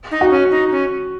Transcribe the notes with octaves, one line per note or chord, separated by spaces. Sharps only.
D#4
F#4
C#4
D#4
C#4